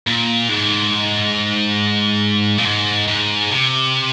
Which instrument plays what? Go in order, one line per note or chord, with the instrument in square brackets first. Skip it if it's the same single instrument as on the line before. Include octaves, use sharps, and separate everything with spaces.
[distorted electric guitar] A#2
G#2
A#2
G#2
G#2
C3